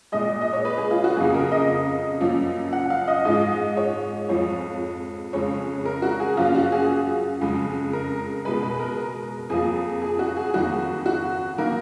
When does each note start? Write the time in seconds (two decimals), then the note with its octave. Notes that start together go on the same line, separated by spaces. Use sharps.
0.12 A#2 G#3 D#5
0.41 D#5
0.53 C#5
0.65 B4
0.78 G#4
0.91 F4
1.04 F#4
1.17 F2 C#3 F#3 A#3 G#4
1.34 A#4
1.51 D#5
2.21 F#2 F3 A#3
2.73 F#5
2.90 F5
3.08 D#5
3.25 G#2 F3 G#3 D#5
3.77 C#5
4.29 F2 F3 G#3 C#5
5.33 F2 C#3 G#3 C#5
5.85 A#4
6.02 F#4
6.20 G#4
6.37 F#2 F3 A#3 F4
6.55 F#4
6.72 G#4
7.41 F2 C#3 G#3
7.93 A#4
8.45 B2 G#3 B4
8.63 B4
8.80 A#4
9.50 F2 F3 A#3 G#4
10.02 G#4
10.19 F#4
10.37 G#4
10.54 F2 D#3 F#3 A#3 F#4
11.06 F#4
11.58 D#3 A#3 A#4